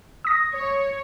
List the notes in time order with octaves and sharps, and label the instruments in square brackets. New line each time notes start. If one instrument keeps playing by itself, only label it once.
[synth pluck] D#6 A#6
[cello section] C#5